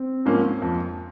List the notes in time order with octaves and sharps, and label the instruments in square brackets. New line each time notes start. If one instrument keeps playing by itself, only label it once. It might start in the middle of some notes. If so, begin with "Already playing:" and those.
Already playing: [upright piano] C4
[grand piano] G#2 F3 A#3 C#4
F2